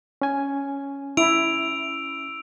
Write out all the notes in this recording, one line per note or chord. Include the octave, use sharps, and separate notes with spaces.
C#4 G#5
E4 E6 D7 F7